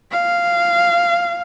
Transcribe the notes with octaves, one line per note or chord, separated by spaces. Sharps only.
F5